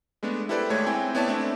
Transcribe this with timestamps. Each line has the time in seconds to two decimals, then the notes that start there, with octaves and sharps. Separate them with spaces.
0.23 G#3 A3 B3 D4
0.49 E4 G4 A4 B4 C5 D5
0.70 D#2 G#3 A3 C#5 G#6
0.86 C4 E4 G5 G#5
1.15 B3 E4 C#5 D5 E5 A5
1.27 A3 C4 D4 E4